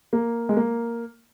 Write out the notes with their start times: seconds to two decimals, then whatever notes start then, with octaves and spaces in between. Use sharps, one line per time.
0.13 A#3
0.49 G#3
0.57 A#3